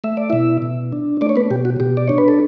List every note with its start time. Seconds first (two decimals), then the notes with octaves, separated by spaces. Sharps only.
0.04 A3 E5
0.17 D5
0.30 B2 E4 E5
0.62 B2
0.92 D4
1.21 A3 D4 D5
1.29 C#5
1.36 B3 B4
1.51 B2 G4
1.65 F#4
1.80 B2 G4
1.97 D5
2.08 D4 C#5
2.18 B4
2.28 A4